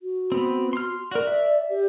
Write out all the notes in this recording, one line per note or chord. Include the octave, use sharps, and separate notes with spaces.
F#4
B3 C4
C6 F6
F#4 A#4 D5
E5
G4